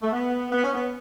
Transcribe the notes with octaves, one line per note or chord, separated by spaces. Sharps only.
A3
B3
B3
C#4
B3